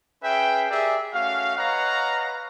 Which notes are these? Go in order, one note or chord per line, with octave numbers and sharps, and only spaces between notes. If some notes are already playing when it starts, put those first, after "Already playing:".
C#4 G#4 B4 E5 G5
G4 G#4 A#4 D5 E5
A3 C#4 F#4 F5
B4 C#5 D#5 F5 F#5 A#5